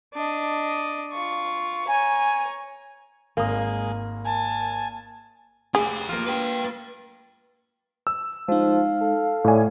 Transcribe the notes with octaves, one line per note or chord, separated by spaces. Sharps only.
D4 D#5
F4 C#6
C#5 G#5 A#5
G#1 G#3 A#3 D#6
G#5 A5
G4 G#4 F5
A#3 F4
B4 G5
E6
F3 G#3 D#4 F5
A4
A2 C#5 D5 G#5